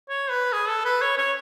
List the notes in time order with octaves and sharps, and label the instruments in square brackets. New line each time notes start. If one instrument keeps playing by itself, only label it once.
[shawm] C#5
B4
G#4
A4
B4
C#5
C#5